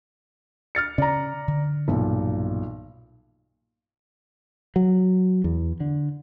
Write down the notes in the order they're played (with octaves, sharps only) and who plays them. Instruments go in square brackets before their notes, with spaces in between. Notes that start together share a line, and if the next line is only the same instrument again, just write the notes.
[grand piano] F6 A6 C#7
[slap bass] C#3 C#4 [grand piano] D5 A#5
[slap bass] D3
[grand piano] B1 A#2 [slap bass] G2 E3 B3
[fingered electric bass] F#3
E2
D3